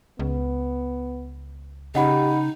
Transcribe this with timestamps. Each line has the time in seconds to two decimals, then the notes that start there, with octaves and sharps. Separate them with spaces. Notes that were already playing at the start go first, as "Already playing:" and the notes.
0.19 C#2 B3
1.95 C#3 D#4 G4 D#5 F#5 B5